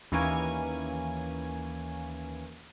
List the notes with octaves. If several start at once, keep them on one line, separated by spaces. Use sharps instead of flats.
D#2 E3 A#3 C#4 G#5